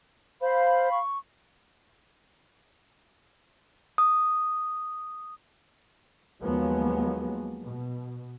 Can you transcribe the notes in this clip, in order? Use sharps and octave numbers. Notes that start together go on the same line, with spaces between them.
C5 F5 B5
C#6
D#6
D#2 F3 F#3 G#3 A#3 B3
B2